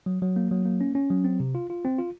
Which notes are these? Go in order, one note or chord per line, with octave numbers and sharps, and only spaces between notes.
F#3
F#3
A#3
F#3
A#3
C#4
C#4
F#3
C4
C3
F4
F4
C4
F4